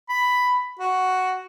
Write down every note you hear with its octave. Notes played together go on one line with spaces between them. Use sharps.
B5
F#4